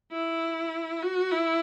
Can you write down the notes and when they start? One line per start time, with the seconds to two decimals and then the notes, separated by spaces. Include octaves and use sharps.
0.11 E4
1.02 F#4
1.31 E4